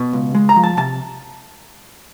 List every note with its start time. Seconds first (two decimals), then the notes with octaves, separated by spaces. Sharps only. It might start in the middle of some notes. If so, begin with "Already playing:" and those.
Already playing: B2
0.13 C#2
0.35 G#3
0.49 A#5
0.56 F3
0.64 A5
0.77 C3 A5